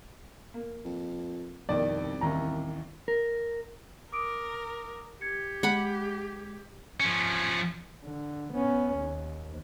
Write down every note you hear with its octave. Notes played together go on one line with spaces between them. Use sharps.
A#3
F2
C2 F2 B2 D#3 D5
A1 D#2 E4 A#5
A#4
A#4 D6 D#6 D7
G4 G#6 C#7
G#3 F#5 B5
F3 C#4
D3
B3 C#4
D#2